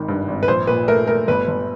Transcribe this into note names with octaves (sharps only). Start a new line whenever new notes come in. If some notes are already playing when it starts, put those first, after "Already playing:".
Already playing: G#1 D#3
G2
G#1
B4
A#1 C5
A#2 B4
A3 A#4
A3 A#4
G1 B4
G1